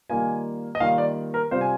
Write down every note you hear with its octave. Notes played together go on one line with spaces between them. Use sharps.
D#3 G3 A#3 F4 G#5
D#5
D#3 G3 A#3 F4 F5
D5
A#4
C3 G3 C4 F4 C5
G#5